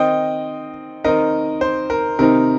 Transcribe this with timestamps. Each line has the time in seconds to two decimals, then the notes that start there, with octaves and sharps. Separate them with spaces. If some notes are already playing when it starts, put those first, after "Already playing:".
Already playing: D#3 C4 D#4 D#5 G5
1.04 D#3 C4 D#4 A#4 D#5
1.61 C5
1.90 A#4
2.19 C3 D#3 C4 D#4 A#4